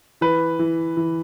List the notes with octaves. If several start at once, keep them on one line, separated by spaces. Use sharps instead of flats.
E3 B4
E3
E3